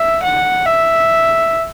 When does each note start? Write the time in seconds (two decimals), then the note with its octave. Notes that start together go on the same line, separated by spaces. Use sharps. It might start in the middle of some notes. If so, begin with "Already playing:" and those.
Already playing: E5
0.23 F#5
0.66 E5